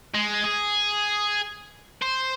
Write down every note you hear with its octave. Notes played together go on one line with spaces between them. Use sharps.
G#3
G#4
C5